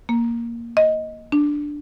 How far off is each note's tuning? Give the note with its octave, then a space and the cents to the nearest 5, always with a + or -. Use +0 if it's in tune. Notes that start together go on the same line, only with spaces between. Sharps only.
A#3 +0
D#5 +10
D4 +0